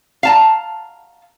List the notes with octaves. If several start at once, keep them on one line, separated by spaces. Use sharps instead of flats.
F5 A5 A#5